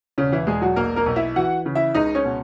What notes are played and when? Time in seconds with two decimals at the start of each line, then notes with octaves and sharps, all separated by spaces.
0.18 E1 C#3 C#4
0.32 E3 E4
0.47 E1 G#3 G#4
0.62 F#3 F#4
0.76 B1 A#3 A#4
0.96 A#3 A#4
1.06 B1
1.16 E4 E5
1.36 E3 F#4 F#5
1.66 C#3
1.75 E4 E5
1.94 C#2 D#4 D#5
2.15 C#4 C#5
2.25 B2